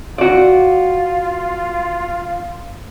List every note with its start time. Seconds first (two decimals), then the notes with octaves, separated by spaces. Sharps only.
0.18 F4 F#4 D5